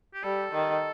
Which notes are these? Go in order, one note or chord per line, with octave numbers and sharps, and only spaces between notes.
G4
G3 A4
D#3